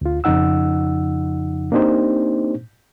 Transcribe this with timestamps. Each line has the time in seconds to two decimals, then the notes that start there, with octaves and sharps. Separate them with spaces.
0.01 D2 F4
0.24 F2 C#3 F3 D#4 F#5 E6
1.72 A#3 C4 D4 D#4 G4 C5